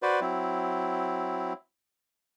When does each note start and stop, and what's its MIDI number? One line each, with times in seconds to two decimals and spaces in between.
0.02 0.20 66
0.02 0.20 71
0.02 0.20 72
0.02 0.20 74
0.21 1.53 54
0.21 1.53 60
0.21 1.53 64